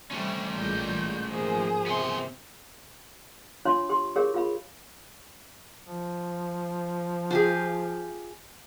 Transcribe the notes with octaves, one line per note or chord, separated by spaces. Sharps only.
C3 G3 A3 C#4
A1 A#2 G3 G#3 G6
G#2 F3 A#3 G#4 C5
C3 B3 C6
D4 F4 C#5 F5 C6
G4 C6
G4 G#4 A#4 C#5 F5
F4 F5 B5
F3
F4 G4 G#4